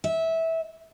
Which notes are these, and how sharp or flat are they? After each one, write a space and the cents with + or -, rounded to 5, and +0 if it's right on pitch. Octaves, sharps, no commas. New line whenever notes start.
E5 -15